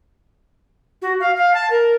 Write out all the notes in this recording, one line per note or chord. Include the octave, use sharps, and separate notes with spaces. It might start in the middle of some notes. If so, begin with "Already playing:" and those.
F#4
F5
F5
A5
A#4